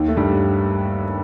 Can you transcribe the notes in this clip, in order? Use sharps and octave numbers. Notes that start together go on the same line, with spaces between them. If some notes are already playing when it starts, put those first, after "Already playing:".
Already playing: D#2 D#3
A3
G2 G3